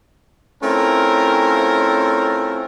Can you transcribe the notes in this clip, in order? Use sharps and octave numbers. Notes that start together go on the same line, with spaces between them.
A3 C4 C#4 E4 F4 A#4